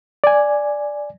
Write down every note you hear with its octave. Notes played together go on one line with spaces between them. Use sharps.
D5 G#5